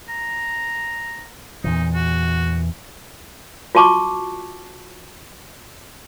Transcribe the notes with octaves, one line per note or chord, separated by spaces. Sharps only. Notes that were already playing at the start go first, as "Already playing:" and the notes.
A#5
E2 A#2 E3 D#4
F#4
F4 F#4 A5 C#6 D6